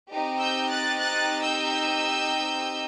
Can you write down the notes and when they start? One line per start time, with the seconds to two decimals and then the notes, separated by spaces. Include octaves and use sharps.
0.11 C4 D#4 G4
0.39 E6 G6
0.69 F#6 A6
0.98 F#6 A6
1.42 E6 G6